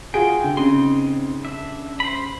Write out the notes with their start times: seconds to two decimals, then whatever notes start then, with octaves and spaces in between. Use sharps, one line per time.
0.14 F4 F#4 G#4 G5
0.44 D3
0.57 C#3 C4 D#4 C6
1.45 D4 E5
2.00 C5 B5